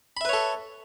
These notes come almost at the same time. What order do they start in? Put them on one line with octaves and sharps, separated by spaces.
B5 E5 B4 C#5 A4